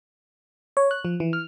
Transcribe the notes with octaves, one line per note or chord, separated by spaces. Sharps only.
C#5
F#6
F3
E3
F6